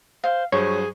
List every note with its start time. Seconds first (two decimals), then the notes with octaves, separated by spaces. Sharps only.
0.24 C5 F5
0.52 G2 F#3 G#4 C5 C#5 C#6